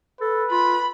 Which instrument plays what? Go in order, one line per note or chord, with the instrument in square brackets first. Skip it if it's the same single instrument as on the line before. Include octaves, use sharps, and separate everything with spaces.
[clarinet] A4 [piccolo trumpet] B4
[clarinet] F4 [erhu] B5